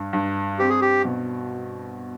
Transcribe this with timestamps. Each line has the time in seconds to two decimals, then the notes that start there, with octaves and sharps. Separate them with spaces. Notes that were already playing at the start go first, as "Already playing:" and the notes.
Already playing: G2
0.13 G2
0.59 C4 G4
0.70 G#4
0.81 G4
1.05 B2